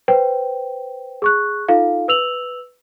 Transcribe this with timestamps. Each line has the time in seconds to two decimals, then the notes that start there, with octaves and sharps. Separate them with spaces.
0.08 B4 C5 G5
1.22 G#4 C#6 F#6
1.68 D#4 F4 A4 F5
2.08 B4 E6 F7 F#7